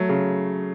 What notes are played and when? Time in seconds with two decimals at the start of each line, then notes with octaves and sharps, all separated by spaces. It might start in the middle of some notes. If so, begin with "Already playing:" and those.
Already playing: F#3 A3
0.09 C#3